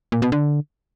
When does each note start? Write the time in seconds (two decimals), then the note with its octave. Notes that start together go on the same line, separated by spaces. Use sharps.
0.12 A#2
0.22 B2
0.32 D3